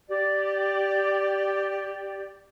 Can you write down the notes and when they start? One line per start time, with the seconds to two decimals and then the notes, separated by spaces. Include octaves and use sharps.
0.08 G4 D5